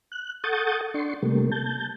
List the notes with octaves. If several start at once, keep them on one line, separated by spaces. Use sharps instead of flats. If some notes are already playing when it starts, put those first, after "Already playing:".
F#6
A4 F#5 C#6 D#6 G6 A6
D4 C6 C#6
C3 G3 A3 A#3
A5 G6